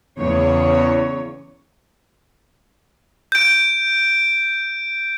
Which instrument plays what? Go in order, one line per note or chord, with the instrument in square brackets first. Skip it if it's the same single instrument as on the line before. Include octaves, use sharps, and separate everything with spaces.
[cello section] E2 C#3 C#5
[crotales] G6 D7